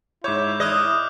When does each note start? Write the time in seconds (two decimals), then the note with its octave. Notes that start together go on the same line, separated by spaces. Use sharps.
0.24 G#2 E4 C#5 D6 G6
0.60 D#5 D#6 F6 F#6